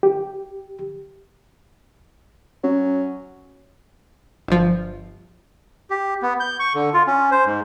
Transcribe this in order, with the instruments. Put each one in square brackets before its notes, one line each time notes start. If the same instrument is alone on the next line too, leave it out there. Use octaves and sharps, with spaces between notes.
[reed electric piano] G4
[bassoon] F#3 [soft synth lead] C#4
[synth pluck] G1 F3
[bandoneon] G4
B3
G6
C#6
D3
F4
C#4
C5
G#2